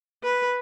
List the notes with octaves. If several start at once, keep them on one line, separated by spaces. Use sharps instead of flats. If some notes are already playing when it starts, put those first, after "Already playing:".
B4